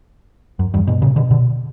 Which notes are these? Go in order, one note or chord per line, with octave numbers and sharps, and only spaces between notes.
F#2
E2 G2
G2 B2
A#2 C#3
B2 D3
B2 D3